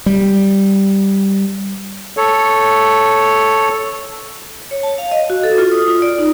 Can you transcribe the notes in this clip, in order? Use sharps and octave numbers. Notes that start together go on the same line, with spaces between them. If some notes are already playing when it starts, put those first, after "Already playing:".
G3
A4 C#5
C#5
A5
F5
D#5
F#4
A4
F4
D#6
F4
D5
D#4